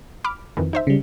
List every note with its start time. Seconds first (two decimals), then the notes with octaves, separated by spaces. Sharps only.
0.24 B5 D6 F6
0.57 F2 D#3 E3
0.73 D#4 C5 E5
0.87 C#3 G3